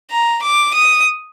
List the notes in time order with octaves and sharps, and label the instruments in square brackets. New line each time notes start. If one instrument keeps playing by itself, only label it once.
[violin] A#5
D6
D#6